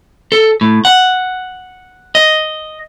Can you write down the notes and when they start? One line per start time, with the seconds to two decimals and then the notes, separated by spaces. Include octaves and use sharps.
0.32 A4
0.61 A2
0.85 F#5
2.15 D#5